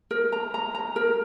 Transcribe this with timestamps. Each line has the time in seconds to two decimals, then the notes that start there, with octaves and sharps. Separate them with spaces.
0.11 A#4
0.32 A#5
0.54 A#5
0.75 A#5
0.96 A#4